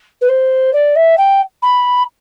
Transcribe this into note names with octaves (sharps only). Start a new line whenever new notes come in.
B4
C5
D5
E5
G5
B5